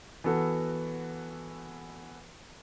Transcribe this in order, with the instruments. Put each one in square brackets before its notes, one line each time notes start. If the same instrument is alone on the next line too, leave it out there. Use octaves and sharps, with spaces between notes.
[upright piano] E3 B3 F#4 A4